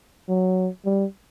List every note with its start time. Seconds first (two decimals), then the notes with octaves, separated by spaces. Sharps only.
0.29 F#3
0.85 G3